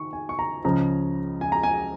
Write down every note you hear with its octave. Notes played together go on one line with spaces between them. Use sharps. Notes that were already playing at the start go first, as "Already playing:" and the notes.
Already playing: D#3 C#6
G#5
C#6
A#5
C#2 C#3 F3 A#5
G#5
A#5
G#5